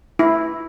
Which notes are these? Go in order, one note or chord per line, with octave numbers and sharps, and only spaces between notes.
E4